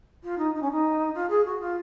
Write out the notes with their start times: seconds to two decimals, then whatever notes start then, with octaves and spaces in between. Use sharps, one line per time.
0.23 F4
0.38 D#4
0.54 D#4
0.62 C#4
0.71 D#4
1.14 F4
1.30 G#4
1.45 F#4
1.60 F4